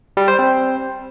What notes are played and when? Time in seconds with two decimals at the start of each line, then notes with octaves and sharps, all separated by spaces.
0.17 G3
0.28 C5
0.39 C4